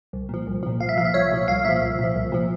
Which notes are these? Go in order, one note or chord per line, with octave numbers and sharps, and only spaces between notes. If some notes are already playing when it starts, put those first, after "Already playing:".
C2
A#2 F3
C2
A#2 F3
C2 F5
E5
A#2 F3 F5
E5
C2 C#5
A#2 F3
C2 F5
A#2 F3 E5
C2
A#2 F3
C2
A#2 F3